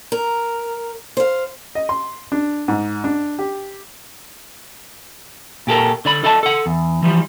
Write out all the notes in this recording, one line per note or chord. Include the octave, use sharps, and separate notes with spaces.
A#4
C5 F5
D#5
C6
D4
G#2
D4
G4
A#2 G4 A4 A#4
D3 D5 B5
A4 D5 D#5 A5
A4 F#5
E2
E3 F3 G3